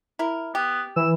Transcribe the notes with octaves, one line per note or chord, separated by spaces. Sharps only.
E4 A#4
B3 G4
E3 E6